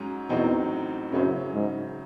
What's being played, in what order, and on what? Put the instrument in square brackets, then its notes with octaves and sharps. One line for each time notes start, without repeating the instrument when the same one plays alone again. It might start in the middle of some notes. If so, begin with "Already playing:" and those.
Already playing: [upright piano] G#2 F#3 C#4
[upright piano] A1 A2 F#3 C4 D#4 [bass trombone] E2
[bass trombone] F#2 [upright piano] C#3 F#3 C#4 E4 C5
[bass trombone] G#2